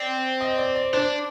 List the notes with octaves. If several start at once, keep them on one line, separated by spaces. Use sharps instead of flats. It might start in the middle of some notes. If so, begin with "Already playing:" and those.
Already playing: C4 D5
D#5
D5
D5
D4 C5